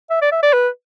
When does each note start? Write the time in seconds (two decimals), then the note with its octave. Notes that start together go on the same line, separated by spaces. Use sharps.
0.10 E5
0.21 D5
0.32 E5
0.43 D5
0.53 B4